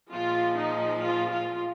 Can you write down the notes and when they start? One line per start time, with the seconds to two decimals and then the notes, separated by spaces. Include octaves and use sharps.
0.11 A#2 F3 G#3 F4
0.55 D#4
0.99 F4
1.29 F4